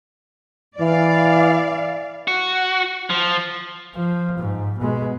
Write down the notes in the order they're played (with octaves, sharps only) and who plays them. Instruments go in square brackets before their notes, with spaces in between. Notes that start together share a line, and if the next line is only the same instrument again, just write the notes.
[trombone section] E3 [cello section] D5 F5
[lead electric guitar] F#4
F3
[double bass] F3
G#2
B2 G#3